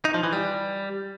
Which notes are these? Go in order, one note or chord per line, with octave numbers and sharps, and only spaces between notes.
D#4
F3
E3
G3